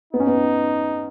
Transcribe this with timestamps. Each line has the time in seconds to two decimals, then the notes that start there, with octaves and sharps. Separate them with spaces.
0.13 B3 D#4
0.20 C#4
0.27 B3